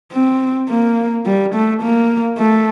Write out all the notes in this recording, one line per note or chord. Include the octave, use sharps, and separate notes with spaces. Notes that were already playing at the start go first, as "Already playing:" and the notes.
C4
A#3
G3
A3
A#3
A3